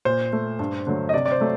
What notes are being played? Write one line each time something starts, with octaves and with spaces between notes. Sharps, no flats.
A#2 C5
A3
G2
D3 F#3 A3
D#5
C3 D5
D5
C5
F#3 A3